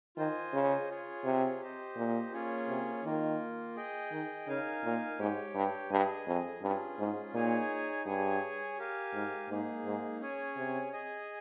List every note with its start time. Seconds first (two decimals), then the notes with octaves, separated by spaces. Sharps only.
0.17 D#3 F4 C5 D#5 G#5
0.54 C#3
0.89 F4 G#4 C#5
1.25 C3
1.61 G4 C5 D#5
1.97 A#2
2.33 A#3 C#4 F4 G#4 C#5
2.68 C3
3.04 D#3 A#3 F4 A#4
3.76 G#4 D#5 G5
4.12 D#3
4.47 C#3 D#4 A#4 F5 G#5
4.84 A#2
5.19 G#2 G4 C#5 G5
5.55 G2
5.91 G2 G#4 D#5 G#5
6.27 F2
6.62 G2 C#4 F4 G#4
6.99 G#2
7.34 A#2 D#4 G#4 C#5 G#5
8.05 G2 G#4 C#5 G#5
8.78 G4 A#4 F5 G#5
9.13 G#2
9.49 G#2 A#3 D#4 G#4
9.85 G#2
10.20 C#4 G#4 C#5 G#5
10.56 C3
10.93 G#4 D#5 G#5